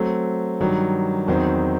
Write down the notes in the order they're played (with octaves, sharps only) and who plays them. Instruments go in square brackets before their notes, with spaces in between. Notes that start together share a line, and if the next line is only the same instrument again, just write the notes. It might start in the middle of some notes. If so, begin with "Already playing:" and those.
Already playing: [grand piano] F#3 A3 C4
G2 D#3 F#3
E2 D#3 F#3 C4